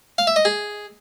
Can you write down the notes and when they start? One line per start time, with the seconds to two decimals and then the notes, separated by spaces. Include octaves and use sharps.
0.18 F5
0.27 E5
0.36 D#5
0.45 G#4